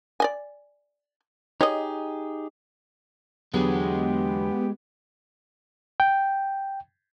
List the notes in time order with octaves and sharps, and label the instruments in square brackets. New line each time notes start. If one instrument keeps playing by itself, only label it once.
[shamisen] D5 D#5 G#5
[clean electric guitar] D#4 G4 G#4 [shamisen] C#5 D#5
[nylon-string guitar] E2 D3 F#3 [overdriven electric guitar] G#3 [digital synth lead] B3 [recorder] G4
[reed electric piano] G5